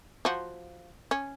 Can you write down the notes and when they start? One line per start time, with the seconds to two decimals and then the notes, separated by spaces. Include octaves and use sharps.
0.25 F3 F#4
1.11 C#4